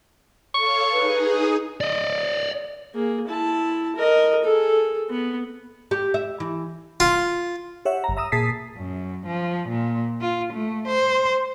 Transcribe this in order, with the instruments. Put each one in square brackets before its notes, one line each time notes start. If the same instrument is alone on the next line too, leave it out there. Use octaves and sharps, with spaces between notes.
[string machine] A4 C#5 F5 [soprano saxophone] C#6
[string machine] D#4 G#4 D#5 [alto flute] B4
[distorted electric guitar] D5 D#5
[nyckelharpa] A#3 G#4
E4 A5
A#4 D#5
G#4 A4
B3
[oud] G4
E5
E3
[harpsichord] F4
[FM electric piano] G4 C#5 E5 F#5
G1 A#5
E5 A#5 D#6 E6
A#2 G#4 A5 D#6 B6 C7
[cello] F#2
F3
A#2
F4
A3
C5